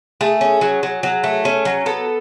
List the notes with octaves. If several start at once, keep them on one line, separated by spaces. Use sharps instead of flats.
A3 G#4
C#4
F#3
F#3
F#3
A3
C#4
F#3
B3 A4